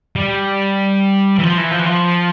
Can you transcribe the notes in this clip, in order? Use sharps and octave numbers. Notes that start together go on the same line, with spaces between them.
G3
E3
F3
E3
F3
E3
F3